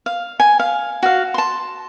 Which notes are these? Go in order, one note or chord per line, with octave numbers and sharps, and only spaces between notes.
F5
G#5
F5
F#4 F5
A5 C6